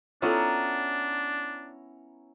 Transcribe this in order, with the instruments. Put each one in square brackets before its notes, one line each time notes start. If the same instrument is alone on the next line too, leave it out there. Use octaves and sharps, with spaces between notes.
[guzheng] B3 C#4 E4 [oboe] D4 [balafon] F4 A4 [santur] A#5